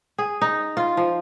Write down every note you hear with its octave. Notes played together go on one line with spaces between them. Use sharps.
G#4
D#4
F4
F3